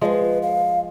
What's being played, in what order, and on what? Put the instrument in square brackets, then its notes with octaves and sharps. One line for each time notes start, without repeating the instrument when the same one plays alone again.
[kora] F3 G#3 [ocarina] D5
[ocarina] B4
F5